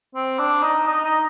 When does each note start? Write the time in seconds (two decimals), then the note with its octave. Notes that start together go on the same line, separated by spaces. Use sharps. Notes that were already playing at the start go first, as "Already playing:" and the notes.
0.15 C4
0.39 D4
0.63 D#4
0.87 D#4
1.04 D#4